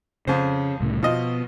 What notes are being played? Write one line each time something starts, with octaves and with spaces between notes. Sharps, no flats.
F2 C#3 C5
C2 A2 C#3
B2 F3 D#5